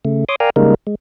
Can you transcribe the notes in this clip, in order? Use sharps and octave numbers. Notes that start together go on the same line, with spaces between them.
C#3 A3
C#5 C6 D6 D#6
A#4 D5 F5 G5 G#5 A#5
C#3 G3 G#3 A#3 D#4 A#4
G#3